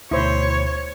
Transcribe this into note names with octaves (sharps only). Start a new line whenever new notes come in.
D2 B2 E4 C5 C#5